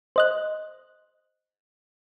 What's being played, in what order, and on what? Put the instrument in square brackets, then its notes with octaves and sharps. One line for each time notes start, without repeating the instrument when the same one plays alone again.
[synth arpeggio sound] C5 D#5 F#6